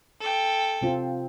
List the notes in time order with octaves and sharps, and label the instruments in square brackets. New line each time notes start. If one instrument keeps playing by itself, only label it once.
[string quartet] A4 G5
[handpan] C3 C4 F4